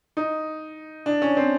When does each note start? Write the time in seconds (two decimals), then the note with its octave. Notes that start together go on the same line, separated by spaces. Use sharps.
0.17 D#4
1.06 D4
1.22 C#4
1.37 C4